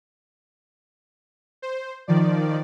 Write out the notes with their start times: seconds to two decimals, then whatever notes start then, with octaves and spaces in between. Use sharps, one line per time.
1.62 C5
2.08 D#3 F3 D5